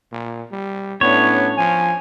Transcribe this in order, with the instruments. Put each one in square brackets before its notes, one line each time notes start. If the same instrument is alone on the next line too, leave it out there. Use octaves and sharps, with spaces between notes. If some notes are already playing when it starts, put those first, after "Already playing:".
[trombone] A#2
G3
[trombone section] A2 C#4 D4 [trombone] B3 [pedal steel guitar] C#5
[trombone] F3 [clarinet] G#5